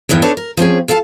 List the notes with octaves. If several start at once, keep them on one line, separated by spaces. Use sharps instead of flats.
E2 G2 D#3 E3
D4 D#4 A4 B4 C#5
A#4
F3 C4 C#4 G#4
F4 A4 F5 F#5 A5